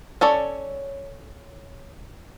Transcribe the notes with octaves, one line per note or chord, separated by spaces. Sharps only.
C#4 A4 C#5 D5